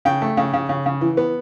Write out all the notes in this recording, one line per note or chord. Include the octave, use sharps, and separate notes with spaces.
C#3 G5
A3
C#3
C#3
C#3
C#3
E3
B3